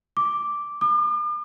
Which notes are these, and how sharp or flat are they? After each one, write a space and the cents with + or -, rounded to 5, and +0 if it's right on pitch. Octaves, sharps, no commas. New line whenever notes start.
D6 +0
D6 +45